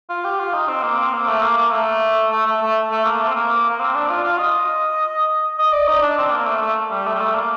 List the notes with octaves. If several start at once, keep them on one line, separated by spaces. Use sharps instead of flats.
F4
G4
F4
D#4
C4
A#3
C4
A#3
A3
A#3
A#3
A3
A3
A3
A3
A3
A#3
A3
C4
A#3
A#3
C4
D4
F4
F4
D#5
D#5
D5
D#4
D4
C4
A#3
A3
A3
G3
A3
G3
A3
A#3